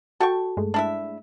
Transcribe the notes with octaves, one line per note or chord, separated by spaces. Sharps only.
F#4 A4 G5 C#6
G2 G#3 A3
D4 E4 E5